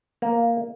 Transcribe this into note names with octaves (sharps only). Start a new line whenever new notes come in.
A#3